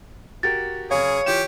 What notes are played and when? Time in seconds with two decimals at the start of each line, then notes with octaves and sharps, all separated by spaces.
0.43 F#4 G4 A#4 A6
0.91 F#2 C#3 G#4 C#5 F5
1.26 E3 F4 G4 E7